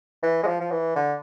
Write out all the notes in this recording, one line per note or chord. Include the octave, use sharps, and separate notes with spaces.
E3
G#3
F3
F3
E3
D3